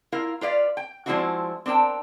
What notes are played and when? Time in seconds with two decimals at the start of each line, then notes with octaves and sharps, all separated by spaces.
0.12 E4 F4 A#4 F5
0.41 F4 B4 D5 F5
0.77 G5
1.06 F3 G#3 C4 D4 E4 F#4
1.66 C4 D4 A#4 G5 A5